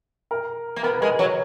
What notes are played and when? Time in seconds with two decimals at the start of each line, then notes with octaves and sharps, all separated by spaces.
0.31 A#4
0.76 A#3
0.83 B3 A#4
0.93 B4
1.01 G#3 A#4
1.19 F#3